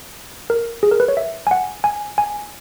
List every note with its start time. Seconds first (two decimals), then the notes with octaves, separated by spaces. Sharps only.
0.50 A#4
0.83 G#4
0.91 A#4
1.00 B4
1.08 C#5
1.17 E5
1.47 G#5
1.51 F#5
1.84 G#5
2.18 G#5